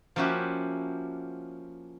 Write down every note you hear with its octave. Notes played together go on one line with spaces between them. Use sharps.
F3 A#3 C#4 E4 F#4 G4